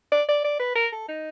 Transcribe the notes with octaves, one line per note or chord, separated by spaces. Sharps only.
D5
D5
D5
B4
A#4
A4
D#4